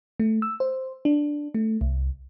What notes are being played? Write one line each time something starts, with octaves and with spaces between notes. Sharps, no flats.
A3
E6
C5
D4
A3
C2